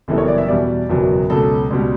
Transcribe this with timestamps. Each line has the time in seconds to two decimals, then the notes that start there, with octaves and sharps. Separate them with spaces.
0.08 F#1 F#2 E3 G3 B3 A4
0.18 C#5
0.28 D5
0.38 E5
0.48 E2 B2 G3 D5
0.89 F#1 E2 B2 F#3
1.30 C#2 B2 F#3 A4
1.70 C#2 B2 G3